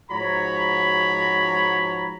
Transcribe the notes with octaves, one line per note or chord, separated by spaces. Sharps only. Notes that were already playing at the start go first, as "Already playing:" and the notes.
G#2 F3 F#4 C#5 A#5 B5